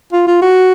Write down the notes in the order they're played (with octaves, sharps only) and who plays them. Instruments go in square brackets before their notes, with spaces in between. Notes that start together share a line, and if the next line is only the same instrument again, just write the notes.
[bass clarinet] F4
F4
F#4